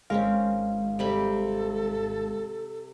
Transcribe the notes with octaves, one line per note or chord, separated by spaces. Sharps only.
G#1 G#3 C4 C#4 A#4 F5
C3 G3 A4 B5